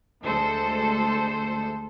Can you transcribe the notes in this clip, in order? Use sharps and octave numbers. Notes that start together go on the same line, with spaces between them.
D2 G#3 A4 C5